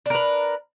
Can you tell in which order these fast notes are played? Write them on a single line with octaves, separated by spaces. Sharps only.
D4 A#4 B4